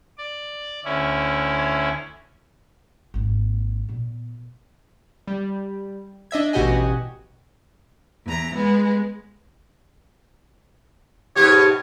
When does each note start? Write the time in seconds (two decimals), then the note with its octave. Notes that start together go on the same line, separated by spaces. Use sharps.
0.18 D5
0.85 D2 C#4 E4
3.14 G#1 A#3
3.89 A#2 B3
5.27 G3
6.31 D4 D#5 E5 G#6
6.53 A1 B2 F#4 G4 D#5 G#5
8.25 E2 A#5
8.54 G#3 B3
11.36 G#2 B2 G4 C#5